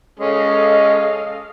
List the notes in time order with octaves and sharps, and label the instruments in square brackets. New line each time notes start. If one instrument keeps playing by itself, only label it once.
[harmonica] G#3 C#4 [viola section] A4 D#5 F5